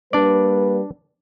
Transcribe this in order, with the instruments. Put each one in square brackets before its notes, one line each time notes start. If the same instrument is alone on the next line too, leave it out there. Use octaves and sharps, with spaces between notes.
[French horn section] G3 A#3 B4 [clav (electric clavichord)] D4 D5